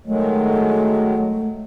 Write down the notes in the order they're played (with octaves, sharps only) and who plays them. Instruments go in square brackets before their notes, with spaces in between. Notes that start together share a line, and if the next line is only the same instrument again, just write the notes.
[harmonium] D#3 F#3 G#3 [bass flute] A3